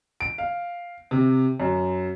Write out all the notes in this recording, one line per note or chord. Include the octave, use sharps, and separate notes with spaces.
D7
F5
C3
F#2